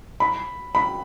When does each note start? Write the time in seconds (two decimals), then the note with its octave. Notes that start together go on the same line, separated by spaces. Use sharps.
0.20 B5
0.75 B5